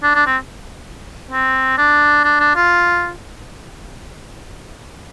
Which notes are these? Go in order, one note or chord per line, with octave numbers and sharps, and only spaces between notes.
D4
D4
C4
C4
D4
D4
D4
F4